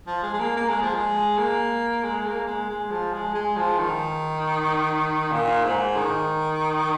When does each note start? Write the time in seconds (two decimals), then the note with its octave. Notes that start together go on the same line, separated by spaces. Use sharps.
0.07 F3
0.23 G#3
0.33 G#3
0.39 A#3
0.56 A#3
0.69 G#3
0.82 F3
0.94 G#3
1.38 A#3
2.03 G#3
2.26 A#3
2.47 G#3
2.70 G#3
2.91 F3
3.13 G#3
3.35 G#3
3.56 F3
3.79 D#3
5.32 A#2
5.65 G#2
5.97 D#3